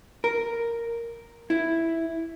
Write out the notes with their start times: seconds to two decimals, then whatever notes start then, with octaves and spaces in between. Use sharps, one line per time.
0.24 A#4
1.50 E4